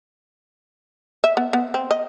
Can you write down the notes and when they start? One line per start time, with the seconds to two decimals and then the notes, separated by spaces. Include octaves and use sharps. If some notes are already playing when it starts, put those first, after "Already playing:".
1.24 E5
1.37 B3
1.53 B3
1.74 C4
1.91 D#5